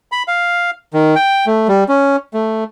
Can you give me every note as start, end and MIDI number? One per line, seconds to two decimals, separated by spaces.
0.12 0.23 83
0.28 0.71 77
0.93 1.15 51
1.16 1.46 79
1.46 1.68 57
1.68 1.84 55
1.88 2.16 61
2.33 2.64 57